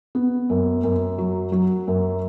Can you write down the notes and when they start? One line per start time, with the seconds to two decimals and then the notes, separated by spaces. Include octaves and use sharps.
0.15 B3
0.50 F#2
0.84 F#2
1.18 F#3
1.52 F#3
1.87 F#2